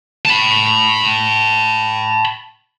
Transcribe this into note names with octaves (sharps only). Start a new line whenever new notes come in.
A5 B5